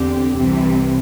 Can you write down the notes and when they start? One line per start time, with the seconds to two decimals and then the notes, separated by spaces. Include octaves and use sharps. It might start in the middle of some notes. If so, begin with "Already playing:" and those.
Already playing: E2 D3 C4 G4
0.36 C2 C3 E3